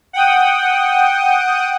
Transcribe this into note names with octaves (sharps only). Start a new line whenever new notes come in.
F#5 G5 D#6